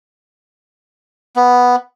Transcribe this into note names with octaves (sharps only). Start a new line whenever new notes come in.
B3